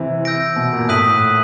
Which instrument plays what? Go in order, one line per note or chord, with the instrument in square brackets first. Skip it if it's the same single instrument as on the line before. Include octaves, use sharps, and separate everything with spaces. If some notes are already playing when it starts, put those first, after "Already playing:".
Already playing: [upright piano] C3 E3
[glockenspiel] E6 G6 A#6 D7
[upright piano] B2
A#2
[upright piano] A2 [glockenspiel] D#6 F#6 B6 D#7 F#7